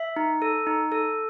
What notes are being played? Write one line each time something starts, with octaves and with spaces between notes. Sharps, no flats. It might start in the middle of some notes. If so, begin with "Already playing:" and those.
Already playing: E5
D#4
A4
D#4
A4